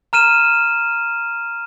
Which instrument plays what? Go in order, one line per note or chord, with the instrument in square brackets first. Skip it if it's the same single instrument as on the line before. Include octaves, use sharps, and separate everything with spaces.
[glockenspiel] A#5 F6 D#7 E7